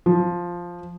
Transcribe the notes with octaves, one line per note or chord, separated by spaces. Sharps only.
F3